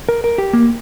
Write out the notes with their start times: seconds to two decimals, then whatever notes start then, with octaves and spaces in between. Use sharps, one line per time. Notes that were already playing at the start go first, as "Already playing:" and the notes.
0.09 A#4
0.24 A#4
0.38 G4
0.53 A#3